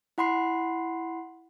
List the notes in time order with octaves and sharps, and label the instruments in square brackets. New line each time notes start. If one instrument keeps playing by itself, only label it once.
[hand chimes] E4 F#5 B5 C6 C7